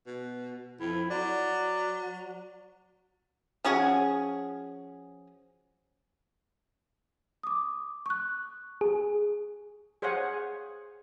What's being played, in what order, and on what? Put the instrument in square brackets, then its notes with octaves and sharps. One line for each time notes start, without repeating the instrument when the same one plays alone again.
[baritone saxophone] B2
[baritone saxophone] F2 [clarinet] E4
[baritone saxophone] F#3 [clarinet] D5
[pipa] F3 C#4 F#4 G#4
[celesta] D6 D#6
C#6 F#6
[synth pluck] G#4
[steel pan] G#4 C5 C#5 F5 F#5 G#5